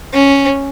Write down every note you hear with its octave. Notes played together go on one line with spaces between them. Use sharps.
C#4